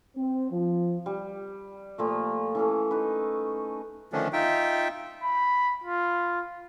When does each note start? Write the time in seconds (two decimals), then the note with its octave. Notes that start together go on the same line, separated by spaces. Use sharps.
0.16 C4
0.51 F3
1.06 G3
1.98 A#2 F3 A3
2.55 E3 C#4 A4
2.91 D#4 B4
4.13 D3 D#3 F3 A3 C#4 D4
4.33 D#4 F4 E5 G5
5.24 B5
5.84 F4